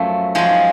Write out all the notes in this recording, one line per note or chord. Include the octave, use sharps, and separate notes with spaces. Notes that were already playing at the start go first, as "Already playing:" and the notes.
Already playing: F#2 F3 A3
F#2 F3 G#3